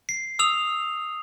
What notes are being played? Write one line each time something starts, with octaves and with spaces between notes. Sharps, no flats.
C7
D#6 E6 F7